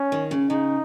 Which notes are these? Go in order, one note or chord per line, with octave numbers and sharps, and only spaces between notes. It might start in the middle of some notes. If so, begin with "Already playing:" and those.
Already playing: C#4
D#3
C#3
C#3 D#4